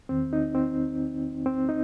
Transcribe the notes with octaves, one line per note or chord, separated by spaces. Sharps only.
E2 D#3 C4
D#4
C4
C4
D#4